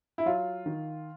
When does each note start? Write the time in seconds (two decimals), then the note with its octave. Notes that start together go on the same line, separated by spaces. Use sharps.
0.18 E4
0.26 F#3 F4
0.66 D#3